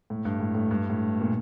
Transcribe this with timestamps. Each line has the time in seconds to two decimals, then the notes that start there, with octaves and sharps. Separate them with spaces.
0.10 A2
0.25 G2
0.40 A2
0.55 A2
0.71 G2
0.90 A2
1.21 A#2